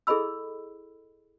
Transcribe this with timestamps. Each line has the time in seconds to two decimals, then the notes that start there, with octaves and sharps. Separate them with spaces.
0.07 E4 G#4 A4 D#5 B5 E6